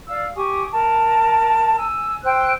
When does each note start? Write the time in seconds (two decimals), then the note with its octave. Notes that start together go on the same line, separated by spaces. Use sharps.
0.08 D5 F5 E6
0.35 G4 G#5 C#6 D#6
0.71 A#4 A5
1.78 G#5 E6
2.24 C5 G5 E6 F#6